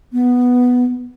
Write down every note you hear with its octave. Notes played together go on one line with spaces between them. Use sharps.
B3